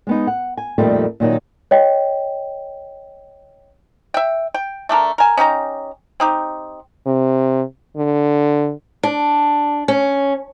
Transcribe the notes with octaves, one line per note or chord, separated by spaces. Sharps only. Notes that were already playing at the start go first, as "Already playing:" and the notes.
G#3 B3 D#4
F#5
G#5
F2 A#2 D#3 G3 A3 C4
A#2 D#3 F#3 D#4
C#5 D#5 G5
E5 G5
G5
A3 D4 A4 A#4
A#4 G#5
C#4 D#4 G4 A#5
C4 D#4 G4
C3
D3
D4
C#4